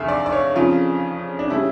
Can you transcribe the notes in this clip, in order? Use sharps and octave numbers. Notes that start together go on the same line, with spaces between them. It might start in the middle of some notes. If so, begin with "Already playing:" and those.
Already playing: F1 E2 D3 E5 F5
D5
D5
C#5
F2 C#3 F3 F4
D4
C#3 G3 E4